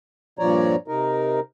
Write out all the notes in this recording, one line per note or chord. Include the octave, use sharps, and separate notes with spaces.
G2 A#2 F3 C#5 D5 A#5
C3 D#4 A#4